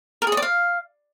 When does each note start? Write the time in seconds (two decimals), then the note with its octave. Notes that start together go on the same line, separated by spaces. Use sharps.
0.22 A#4
0.27 G#4
0.32 D#5
0.37 D5
0.42 F5